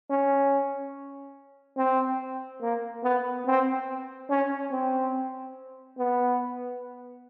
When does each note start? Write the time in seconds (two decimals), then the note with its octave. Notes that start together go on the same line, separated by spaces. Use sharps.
0.10 C#4
1.77 C4
2.62 A#3
3.04 B3
3.46 C4
4.30 C#4
4.71 C4
5.98 B3